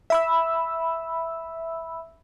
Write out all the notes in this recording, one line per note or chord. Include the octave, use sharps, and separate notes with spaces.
E5 B5 E6